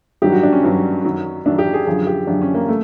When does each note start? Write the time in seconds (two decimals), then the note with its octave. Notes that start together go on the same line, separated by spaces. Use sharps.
0.22 G2 D#3 F#3 G4
0.32 F#4
0.43 D4
0.53 C#4
0.63 G2 D#3 F#3
1.05 F#2 D#3 F#3
1.46 F#2 D#3 F#3 D4
1.58 G4
1.73 G#4
1.86 F#2 D3 F3 G#4
2.07 G4
2.27 F#2 D3 F3 D4
2.42 C#4
2.54 A#3
2.69 A3